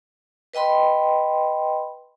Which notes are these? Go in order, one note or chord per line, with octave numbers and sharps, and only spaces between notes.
B4 D#5 G5 B5 C6